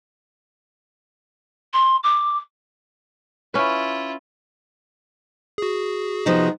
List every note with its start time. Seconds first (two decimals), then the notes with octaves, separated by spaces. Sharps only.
1.74 C6
2.04 D6
3.54 C#4 E4 F4 B4
5.58 F#4 G#4
6.26 C3 F3 B3 D#4